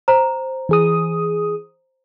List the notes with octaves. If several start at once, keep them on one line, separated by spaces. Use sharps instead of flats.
C5 A#5
E3 G#4 D#6